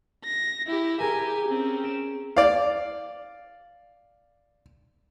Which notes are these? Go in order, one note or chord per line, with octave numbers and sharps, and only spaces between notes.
A#6
E4 G4
G4 G#4 A#4 G#5
C4 C#4
D7 E7
D5 F5